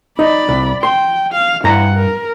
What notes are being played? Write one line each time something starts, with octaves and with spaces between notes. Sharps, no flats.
D#4 D5 B5
C2
G5 C6
F5
G2 E4 F#5 A#5
A#4